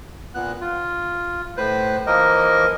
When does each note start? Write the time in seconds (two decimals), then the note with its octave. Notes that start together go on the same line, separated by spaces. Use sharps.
0.35 A#2 B3 F#6
0.61 F4
1.57 A2 B4 C5 F#6
2.07 E3 F3 A#3 A#4 D#5